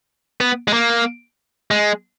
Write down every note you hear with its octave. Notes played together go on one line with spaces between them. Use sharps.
B3
G#3
A#3
G#3